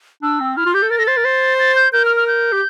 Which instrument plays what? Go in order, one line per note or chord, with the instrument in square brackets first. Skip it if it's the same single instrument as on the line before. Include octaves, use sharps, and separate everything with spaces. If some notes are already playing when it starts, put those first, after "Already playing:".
[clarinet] D4 [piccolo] E6
[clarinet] C4
[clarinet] E4 [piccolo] F6
[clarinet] F4
[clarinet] G4 [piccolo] G6
[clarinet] A4
[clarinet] A#4 [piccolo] A6
[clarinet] A4 [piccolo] A#6
[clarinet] C5 [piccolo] A6
[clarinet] A#4
C5
[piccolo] A6
G6
[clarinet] A#4 [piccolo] G6
[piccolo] F6
F6
G6
[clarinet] G4